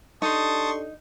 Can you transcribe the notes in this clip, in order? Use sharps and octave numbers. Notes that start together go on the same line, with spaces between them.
D4 D#4 G4 A4 A5 C6 C#6 D#6